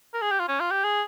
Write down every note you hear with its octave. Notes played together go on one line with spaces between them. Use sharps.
A#4
G#4
G4
F4
C#4
F4
G4
G#4